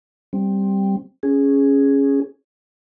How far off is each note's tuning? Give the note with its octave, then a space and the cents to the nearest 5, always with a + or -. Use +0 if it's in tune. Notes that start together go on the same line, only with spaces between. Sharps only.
G3 +0 C4 +10
C#4 +0 G#4 +0